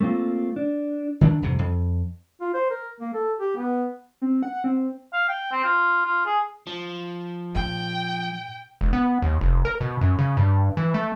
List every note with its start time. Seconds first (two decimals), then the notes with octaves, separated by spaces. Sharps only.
0.01 A3 A#3 C4 F4
0.56 D4
1.21 D#3 E3 D4
1.42 C2 F2 G#2 C3
1.59 F2
2.41 F4
2.54 C5
2.70 A#4
3.00 A#3
3.14 A4
3.39 G4
3.57 B3
4.22 C4
4.43 F#5
4.64 C4
5.13 F5
5.28 G5
5.52 C4
5.64 F4
6.05 F4
6.26 G#4
6.67 F3
7.55 A#2 G5
8.81 E1
8.93 B3
9.22 D#2
9.41 F1
9.65 A#4
9.81 B2
10.01 F#2
10.19 C#3
10.37 G2
10.77 E3
10.94 A3